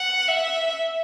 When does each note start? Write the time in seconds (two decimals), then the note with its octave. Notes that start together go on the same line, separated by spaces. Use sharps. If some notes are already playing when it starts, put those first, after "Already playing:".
Already playing: F#5
0.28 E5